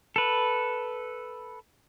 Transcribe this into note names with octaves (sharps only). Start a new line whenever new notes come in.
A4 B4